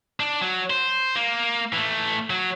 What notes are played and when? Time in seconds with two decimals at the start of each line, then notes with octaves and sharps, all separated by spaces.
0.20 D4
0.41 F#3
0.70 C5
1.16 A#3
1.73 E3 A3
2.30 F#3